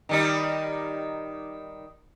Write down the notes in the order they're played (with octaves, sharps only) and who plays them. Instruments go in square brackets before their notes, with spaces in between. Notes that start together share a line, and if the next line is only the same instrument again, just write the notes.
[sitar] D#3 G3 D#4